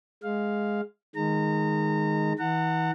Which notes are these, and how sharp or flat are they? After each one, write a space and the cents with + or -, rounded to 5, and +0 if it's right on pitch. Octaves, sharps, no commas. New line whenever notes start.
G#3 +0 F5 +0
D#3 +0 G#3 +0 A#5 -30
E3 -40 F#5 +0 A#5 -45